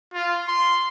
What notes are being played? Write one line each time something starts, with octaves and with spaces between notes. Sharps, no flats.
F4
C6